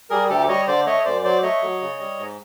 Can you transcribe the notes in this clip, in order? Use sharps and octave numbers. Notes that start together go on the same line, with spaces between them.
G3 G#4 A#4
D2 G4 A4
G3 C#5 D#5
D3 C5 D5
A3 C#5 D#5
F#2 C5 D5
F#3 C5 D5
A3 C#5 D#5
F#3
C#3
G3
G#2